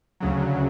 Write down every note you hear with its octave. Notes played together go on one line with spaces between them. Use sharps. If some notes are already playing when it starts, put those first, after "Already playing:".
D2 C#3 F#3